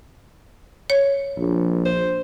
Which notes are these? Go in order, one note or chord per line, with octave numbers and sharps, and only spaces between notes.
C#5
A#1
C5